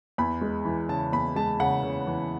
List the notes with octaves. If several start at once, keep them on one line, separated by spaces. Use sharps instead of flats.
E2 B5
G#3
E3
C#3 A5
E2 B5
G#3 A5
C#3 F#5
C#3
E3